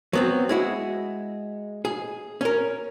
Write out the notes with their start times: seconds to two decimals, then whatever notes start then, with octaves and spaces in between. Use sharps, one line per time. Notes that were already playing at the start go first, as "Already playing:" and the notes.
0.13 F#3 B3 C4
0.49 G#3 E4 F#4
1.85 G#4
2.41 C#4 A#4